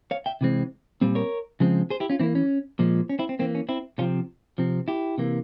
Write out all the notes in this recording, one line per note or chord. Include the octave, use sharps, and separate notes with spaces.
C#5 F5
E5 G5
C3 E3 G#3 C4
A#2 G3 C4
A#4 C#5
C#3 F3 G#3 C4
G#4 C5
E4 G4
C#4 F4
E3 A#3 C4 E4
C#4
A#2 F3 G#3
C#4
C4 E4
C4
E3 A#3 C4
C#4
C4 E4
C3 F3 C4 C#4 F4
C3 F3 C4
E4 G4
C3 E3 A#3